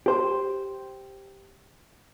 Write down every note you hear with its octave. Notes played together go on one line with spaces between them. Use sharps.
G4 C5